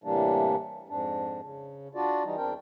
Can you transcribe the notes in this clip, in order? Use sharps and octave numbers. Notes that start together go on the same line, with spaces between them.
A2 C3 E3 G3 A#3 D4
F2 G#2 D4
C#3
D4 F4 F#4 D5
E3 G3 D#4
E2 C4 D4 A#4 G5